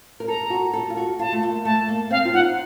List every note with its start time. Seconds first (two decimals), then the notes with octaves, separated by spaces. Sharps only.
0.20 A#4
0.27 A4 A#5
0.50 F#4
0.73 A4
0.90 F4
0.97 F#4
1.19 F4 A5
1.32 A3
1.43 A#3
1.65 A3 A5
1.88 A#3
2.11 C4 F5
2.25 F4
2.34 D#4 F#5